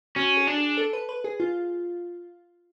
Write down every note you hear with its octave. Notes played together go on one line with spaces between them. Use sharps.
C#4 F#4
G#4
D4
G#4
A4
B4
B4
G#4
F4